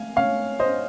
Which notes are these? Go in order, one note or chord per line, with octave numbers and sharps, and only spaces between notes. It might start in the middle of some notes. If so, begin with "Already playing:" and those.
Already playing: F5 G#5
C#5 F5
C5 D#5